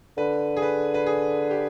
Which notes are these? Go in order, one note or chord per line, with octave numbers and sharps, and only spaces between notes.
D3 B4
G#4
B4
B4
G#4
G4